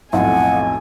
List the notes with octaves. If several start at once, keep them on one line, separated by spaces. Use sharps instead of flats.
B1 F2 A2 F#5 G#5